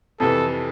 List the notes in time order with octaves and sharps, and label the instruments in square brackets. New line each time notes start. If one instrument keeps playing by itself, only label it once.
[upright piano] F2 C3 E3 [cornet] A4